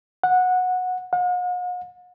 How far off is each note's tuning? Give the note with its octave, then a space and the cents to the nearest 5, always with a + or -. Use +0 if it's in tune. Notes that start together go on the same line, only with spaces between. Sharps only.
F#5 -15
F#5 -45